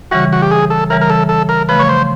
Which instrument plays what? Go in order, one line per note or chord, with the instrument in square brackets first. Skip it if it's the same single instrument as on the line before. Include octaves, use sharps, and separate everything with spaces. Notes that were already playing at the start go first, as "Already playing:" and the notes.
[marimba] C#3 E3 G3 [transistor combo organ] F#4
[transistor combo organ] F#4
G4
G#4
A4
[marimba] C#3 E3 G3 [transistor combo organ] A#4
[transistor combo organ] A#4
A4
A4
A#4
[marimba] C#3 F3 A3 [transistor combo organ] B4
[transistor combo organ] C#5
C5